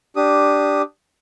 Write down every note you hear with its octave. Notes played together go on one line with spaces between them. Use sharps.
D4 G4 D#6